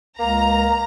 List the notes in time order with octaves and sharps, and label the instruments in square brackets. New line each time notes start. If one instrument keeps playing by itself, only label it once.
[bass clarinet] C#2 [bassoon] A#3 [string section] A#5